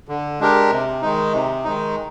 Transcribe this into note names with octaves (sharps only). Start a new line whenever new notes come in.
D3
G#3 D4 G4 A#4
C3
D#3 G#3 D#4
C3
D#3 G#3 D#4